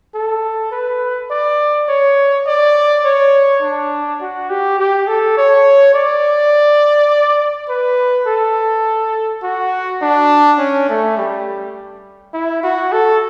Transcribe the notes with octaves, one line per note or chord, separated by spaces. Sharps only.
A4
B4
D5
C#5
D5
C#5
D4
F#4
G4
G4
A4
C#5
D5
B4
A4
F#4
D4
C#4
A3
G3
E4
F#4
A4